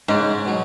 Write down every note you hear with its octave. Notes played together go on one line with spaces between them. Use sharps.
G#2 C#3 G#3 C#4
B2 F#3